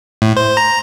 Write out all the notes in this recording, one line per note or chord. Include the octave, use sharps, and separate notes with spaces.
A2
C5
A#5